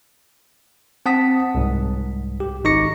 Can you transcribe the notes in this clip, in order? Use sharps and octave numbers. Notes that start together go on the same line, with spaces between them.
C4 F#5 A5 D#6 B6
C2 G#2
G4
G#1 D#4 C#6 D6 A#6 C#7